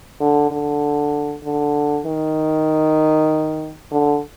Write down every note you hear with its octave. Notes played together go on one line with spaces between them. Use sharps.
D3
D3
D3
D#3
D3